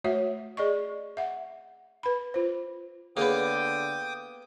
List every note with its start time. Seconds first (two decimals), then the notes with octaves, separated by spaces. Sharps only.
0.04 A3 F#4 C#5 E5
0.57 G#4 D5 D#5 C#6
1.17 E5 F#5
2.03 B4 B5
2.34 F4 C5
3.17 D3 A#3 B3 G#4 C#5 G5 D6 D#6